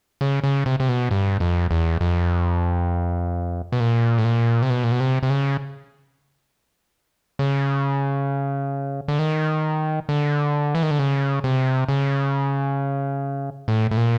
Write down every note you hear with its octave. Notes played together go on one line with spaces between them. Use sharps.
C#3
C#3
C3
C3
B2
G2
F2
E2
F2
B2
A#2
A2
A#2
C3
B2
A#2
B2
C3
C3
C#3
C#3
D3
D#3
D3
E3
D#3
D3
C#3
C3
C#3
A2
A2
A#2